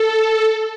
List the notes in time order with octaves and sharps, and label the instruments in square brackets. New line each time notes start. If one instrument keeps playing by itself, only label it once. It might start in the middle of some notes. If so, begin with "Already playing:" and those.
Already playing: [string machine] A4